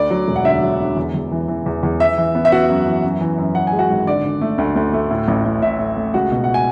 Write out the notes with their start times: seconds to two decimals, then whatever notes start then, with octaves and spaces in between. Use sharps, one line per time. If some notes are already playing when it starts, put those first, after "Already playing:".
Already playing: D2 D5
0.11 F#3
0.28 E1
0.36 F#5
0.45 D3 E5
0.62 F#3
0.80 D3
0.97 E2
1.15 E2
1.32 E3
1.48 E3
1.66 E2
1.83 E2
2.00 E3 E5
2.18 E3
2.35 B3
2.45 E5
2.52 B3 F#4 F#5
2.69 F#2
2.86 E3
3.04 F#2
3.21 E3
3.38 F#2
3.55 E3 F#5
3.67 G#5
3.72 G#3
3.79 F#4 F#5
3.90 G#1
4.07 D3 D5
4.25 D3
4.41 A3
4.58 D2
4.76 D2
4.93 A3
5.11 A2
5.28 A1
5.45 A2
5.62 A2 E5
5.79 A2
5.97 A3
6.14 C#2 F#4 F#5
6.32 B2
6.44 F#5
6.54 G#5